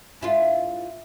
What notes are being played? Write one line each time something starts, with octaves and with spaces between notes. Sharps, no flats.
G#2 E4 F4